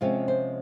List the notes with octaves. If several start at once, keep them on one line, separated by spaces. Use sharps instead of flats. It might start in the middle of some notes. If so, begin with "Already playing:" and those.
C3 F3 G#3 C#4 F4
C5